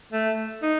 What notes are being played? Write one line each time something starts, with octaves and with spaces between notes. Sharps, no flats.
A3
D#4